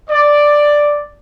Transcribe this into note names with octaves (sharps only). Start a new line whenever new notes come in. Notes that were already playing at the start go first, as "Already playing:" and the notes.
D5